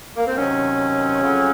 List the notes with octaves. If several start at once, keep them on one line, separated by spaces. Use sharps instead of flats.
A#3
C4
C3 D#3 F#3 C#4
F2 C#3 F#3